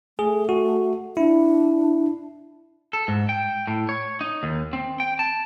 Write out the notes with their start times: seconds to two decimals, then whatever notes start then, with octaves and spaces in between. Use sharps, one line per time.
0.19 A3 G#4
0.49 F#4
1.17 D4 E4
2.93 A4
3.08 G#2
3.29 G5
3.67 A2
3.89 C#5
4.21 D#4
4.43 D#2
4.73 C4
5.00 G5
5.19 A5